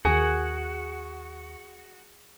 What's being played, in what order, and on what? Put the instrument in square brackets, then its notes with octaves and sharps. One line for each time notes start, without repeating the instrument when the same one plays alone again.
[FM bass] D#2 [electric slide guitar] F#4 [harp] G#4